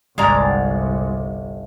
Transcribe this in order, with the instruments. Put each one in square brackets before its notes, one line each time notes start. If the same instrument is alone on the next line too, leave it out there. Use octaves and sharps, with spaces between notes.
[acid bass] G1 [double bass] C2 [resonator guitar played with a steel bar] G#3 D5 A#5